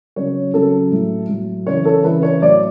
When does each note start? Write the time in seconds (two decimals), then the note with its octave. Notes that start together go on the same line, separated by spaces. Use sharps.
0.16 C#3 F#3 C#5
0.54 C#3 F#3 A4
0.92 A2 F#3
1.29 A2 F#3
1.67 C#3 E3 C#5
1.85 A4
2.04 C#3 E3 B4
2.23 C#5
2.41 A2 F#3 D5